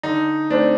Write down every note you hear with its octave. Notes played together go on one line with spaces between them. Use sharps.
D3 D#4
A3 C4 D4